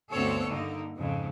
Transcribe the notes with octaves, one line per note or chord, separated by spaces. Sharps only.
D2 G2 B3 C4 A4 C#5
G2 D3 A#3 D#4
F2 G#2 C#3